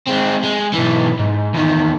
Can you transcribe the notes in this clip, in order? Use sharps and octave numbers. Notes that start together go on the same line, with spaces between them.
G#3 C4
G#3
B1 E3
G#2
E2 D#3